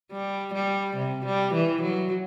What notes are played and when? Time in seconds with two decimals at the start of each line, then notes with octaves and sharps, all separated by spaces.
0.12 G3
0.54 G3
0.97 C3
1.25 G3
1.54 E3
1.82 F#3